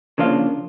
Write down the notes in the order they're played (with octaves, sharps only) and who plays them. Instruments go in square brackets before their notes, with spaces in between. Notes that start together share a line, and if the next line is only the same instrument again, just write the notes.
[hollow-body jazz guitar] C#3 F3 A#3 D4 F4